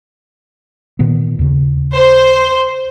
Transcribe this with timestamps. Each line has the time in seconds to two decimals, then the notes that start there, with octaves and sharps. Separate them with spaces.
0.99 A#2 D#3 B3
1.39 D#2 C#3
1.95 C5